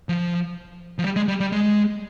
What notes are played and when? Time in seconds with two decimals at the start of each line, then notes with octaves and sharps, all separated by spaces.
0.09 F3
0.99 F3
1.04 G3
1.16 G#3
1.28 G3
1.40 G3
1.52 G#3